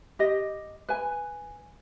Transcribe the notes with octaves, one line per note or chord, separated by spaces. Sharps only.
G4 D#5
B4 G#5